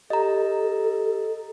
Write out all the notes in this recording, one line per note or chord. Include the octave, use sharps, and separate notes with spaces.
G4 A4 D#5 A#5